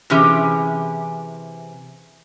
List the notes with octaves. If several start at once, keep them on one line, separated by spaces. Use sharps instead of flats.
C3 E3 C#4 G4 G#4